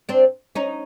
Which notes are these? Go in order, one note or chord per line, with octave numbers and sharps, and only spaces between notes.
C4 D4
C#4 D#4